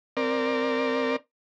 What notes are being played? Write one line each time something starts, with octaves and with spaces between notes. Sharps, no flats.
C4 A#4 D5